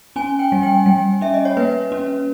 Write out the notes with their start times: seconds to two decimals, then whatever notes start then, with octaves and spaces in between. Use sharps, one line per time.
0.16 C#4 G#5
0.39 G5
0.52 G3
0.63 G5
0.86 G3 G5
1.21 C#4 E5
1.34 D#5
1.45 C#5
1.57 A#3 B4
1.92 C#4